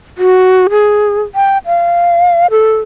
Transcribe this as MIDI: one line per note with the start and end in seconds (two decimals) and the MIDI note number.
0.18 0.68 66
0.70 1.21 68
1.35 1.58 79
1.66 2.46 77
2.51 2.77 69